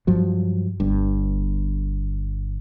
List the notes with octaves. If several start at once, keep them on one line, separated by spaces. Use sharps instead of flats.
G2 F3 F#3
G1 G2